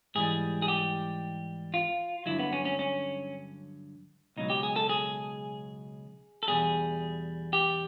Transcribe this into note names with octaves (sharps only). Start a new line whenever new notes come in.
G#2 E3 G3 G#4
G#4
G4
F4
G2 D3 F#3 E4
B3
C#4
C#4
C#4
C#2 B2 F#3 D#4
G4
G#4
A4
G#4
A4
E2 B2 G3 G#4
G4